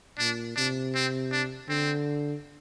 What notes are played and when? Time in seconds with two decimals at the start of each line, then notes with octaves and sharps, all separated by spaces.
0.19 A#2 D4
0.56 C3 D4
0.95 C4
1.32 D4
1.68 D3 C4